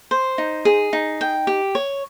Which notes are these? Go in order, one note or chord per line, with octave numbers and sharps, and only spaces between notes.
C5
D#4
G#4
D#4
G5
G4
C#5